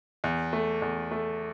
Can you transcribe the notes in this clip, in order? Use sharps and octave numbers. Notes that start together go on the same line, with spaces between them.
E2
A3
E2
A3